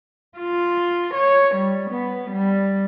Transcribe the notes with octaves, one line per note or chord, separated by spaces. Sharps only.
F4
C#5
G3
B3
G3